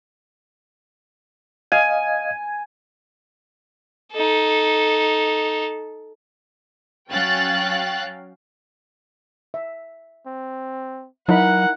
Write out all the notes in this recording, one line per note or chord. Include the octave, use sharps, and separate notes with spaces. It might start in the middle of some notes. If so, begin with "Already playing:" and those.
D#5 F5 G#5
D#4 A4
F#3 C#4 F5 G5 F#6 A6
E5
C4
F#3 D#4 E4 A#4 F#5 B5